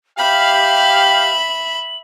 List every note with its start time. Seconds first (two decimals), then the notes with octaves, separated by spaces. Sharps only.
0.18 G4 E5 F5 G5 B5 F#7